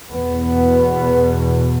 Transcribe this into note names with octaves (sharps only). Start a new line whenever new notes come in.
E2 B2 B3